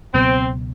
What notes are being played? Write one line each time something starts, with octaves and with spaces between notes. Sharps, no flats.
C#2 B2 F#3 B3 C4